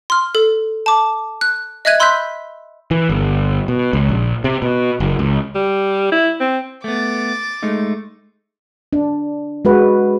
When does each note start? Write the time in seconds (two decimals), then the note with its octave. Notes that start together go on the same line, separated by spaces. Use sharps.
0.10 C6 F6
0.35 A4
0.86 A5 D6
1.41 F#6
1.85 D#5 E5 F#6 G#6 D#7
2.00 B5 C6 E6 F#6 G6 B6
2.91 E3
3.09 G1
3.68 B2
3.93 C#2
4.09 A#1
4.44 C3
4.62 B2
5.00 F#1
5.19 C#2
5.55 G3
6.12 E4
6.40 C4
6.84 A3 B3 D6 A6
7.63 G#3 A3 D#4
8.93 D4
9.65 G#3 F#4 B4